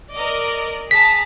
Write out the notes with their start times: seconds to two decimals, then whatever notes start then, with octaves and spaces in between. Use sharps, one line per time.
0.13 A#4 D5 D#5
0.91 G#4 A5 A#5 B6